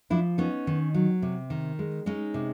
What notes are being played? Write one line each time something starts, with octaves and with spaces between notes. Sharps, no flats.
F3 D4 E4
B3 C#4 D#4
D#3
F#3
C3
D#3
G#3
G#3 C#4 D#4
C3